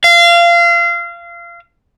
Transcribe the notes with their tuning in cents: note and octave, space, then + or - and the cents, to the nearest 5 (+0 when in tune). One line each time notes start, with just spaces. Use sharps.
F5 -25